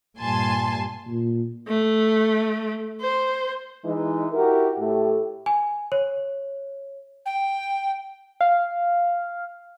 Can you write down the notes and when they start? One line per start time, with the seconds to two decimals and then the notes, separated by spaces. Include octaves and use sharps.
0.18 G2 A#2 G#5 A5 C6
1.07 A#2
1.68 A3
3.00 C5
3.84 E3 G#3 D#4
4.32 E4 F#4 G4 A#4
4.78 A2 A3 G4
5.46 G#5
5.92 C#5
7.26 G5
8.41 F5